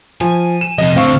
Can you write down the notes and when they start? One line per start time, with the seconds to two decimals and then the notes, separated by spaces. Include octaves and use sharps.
0.21 F3 G#5
0.61 E7
0.78 F2 C3 D#5
0.96 A2 D3 C4 F5 C#6